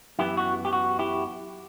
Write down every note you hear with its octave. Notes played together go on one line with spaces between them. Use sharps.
F#2 E3 B3 E4 G4
F#4
G4
F#4
E4 G4